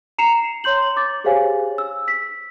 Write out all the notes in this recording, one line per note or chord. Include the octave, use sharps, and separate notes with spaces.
A#5 C7 C#7 E7 F7
C#5 C6 G6 F#7
D6 A6
G4 G#4 C5 C#5 F5 G#5
E6
B6